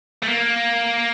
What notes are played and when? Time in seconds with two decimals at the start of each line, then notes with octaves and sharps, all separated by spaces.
0.23 A3
0.29 A#3